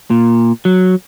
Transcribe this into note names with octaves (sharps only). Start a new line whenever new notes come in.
A#2
F#3